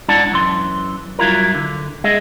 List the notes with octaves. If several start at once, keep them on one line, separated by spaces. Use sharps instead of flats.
G#2 D4 E4 D5 F#5 A5
F#2 E3 C6
G2 F#3 E4 F4 A#4
D3
G#3 G#4 D#5 E5